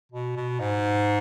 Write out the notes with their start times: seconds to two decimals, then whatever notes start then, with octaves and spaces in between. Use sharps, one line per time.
0.12 B2
0.36 B2
0.60 G#2